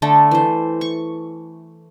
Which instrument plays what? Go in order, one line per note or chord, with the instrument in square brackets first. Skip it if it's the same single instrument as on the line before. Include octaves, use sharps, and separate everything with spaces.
[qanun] D3 A3 A4
E3 C5
C#6